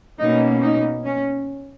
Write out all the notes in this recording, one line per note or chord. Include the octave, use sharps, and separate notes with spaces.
B2 A#3 C#4 D#4
D#4
C#4